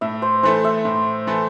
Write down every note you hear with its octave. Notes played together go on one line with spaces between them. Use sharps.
A2 E5
C5
E3 A3 E4 A4 C5
E5
A2
E3 A3 E4 A4